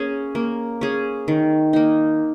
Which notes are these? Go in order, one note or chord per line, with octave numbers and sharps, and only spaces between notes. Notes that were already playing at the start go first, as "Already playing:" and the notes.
Already playing: A#3 C#4 G#4
A#3
C#4 G#4
D#3
A#3 D#4